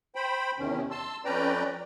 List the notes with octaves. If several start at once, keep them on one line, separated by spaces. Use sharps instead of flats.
C5 G5 B5
E2 C3 D#3 C#4
A5 C6 E6
F2 C#4 B4 D5 G5 A#5